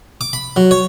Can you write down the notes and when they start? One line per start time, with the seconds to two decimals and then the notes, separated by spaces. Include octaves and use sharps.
0.21 D6
0.33 B5
0.56 F#3
0.71 C#5